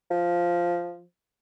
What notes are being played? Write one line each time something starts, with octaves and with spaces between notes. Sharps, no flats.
F3